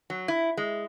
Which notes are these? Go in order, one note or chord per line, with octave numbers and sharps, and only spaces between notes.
F#3
E4
G#3